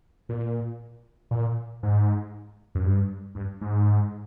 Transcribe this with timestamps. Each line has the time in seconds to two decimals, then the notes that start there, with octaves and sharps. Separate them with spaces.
0.29 A#2
1.31 A#2
1.83 G#2
2.75 F#2
2.84 G2
3.35 G2
3.61 G#2